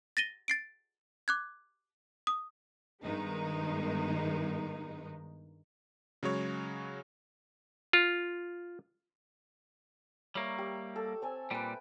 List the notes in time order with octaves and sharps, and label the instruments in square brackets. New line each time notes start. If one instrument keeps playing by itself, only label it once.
[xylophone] A6 A#6 D#7 G7
A6 C7 D7
D6 F#6 G#6
D#6
[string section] G2 D#3 G#3 B3 D#4
[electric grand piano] C#3 F#3 G#3 C#5
[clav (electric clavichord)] F4
[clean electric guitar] G3 A#3 [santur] C#5 E5 A#5
[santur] G4
A4
C4 A4 G#5
[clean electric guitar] A#2 G3 [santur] B4 G5